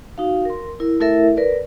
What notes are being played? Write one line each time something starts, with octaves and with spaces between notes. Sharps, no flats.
D#4 F#4 F5
A#4 C6
E4 A#4
A3 E4 A4 A#4 E5
A#4 B4 D5